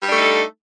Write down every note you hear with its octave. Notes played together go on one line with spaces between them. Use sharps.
G3 A3 D4 D#4 A4